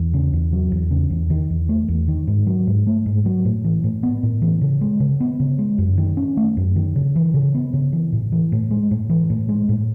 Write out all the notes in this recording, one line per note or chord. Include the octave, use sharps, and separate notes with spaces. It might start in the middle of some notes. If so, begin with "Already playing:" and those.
Already playing: E2
C#3
E2
F#3
E2
C#3
E2
D#3
E2
A3
E2
D#3
G#2
F#3
G#2
A3
G#2
F#3
A2
E3
A2
B3
A2
E3
C#3
G#3
C#3
B3
C#3
G#3
F#2
D#3
C#4
A3
F#2
D#3
C#3
E3
C#3
B3
C#3
E3
A2
E3
A2
G#3
A2
E3
A2
G#3
A2